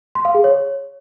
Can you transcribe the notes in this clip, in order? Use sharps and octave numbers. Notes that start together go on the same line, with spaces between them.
C6
F5
G#4
C#5